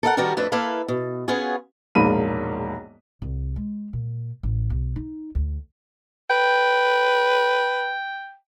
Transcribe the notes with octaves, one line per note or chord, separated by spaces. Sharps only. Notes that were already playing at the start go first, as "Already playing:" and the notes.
A4 A#4 E5 F#5
D#3 G3 F#4 G4 A#4 B4
F2 A3 D4 B4
A#3 E4 A4 B4 F5
B2
B3 C#4 F4 F#4 G#4 C#5
E1 A#1 G#2 A#3 B5 D#7
C2
G#3
A#2
A1
B1
D#4
D2
B4 G5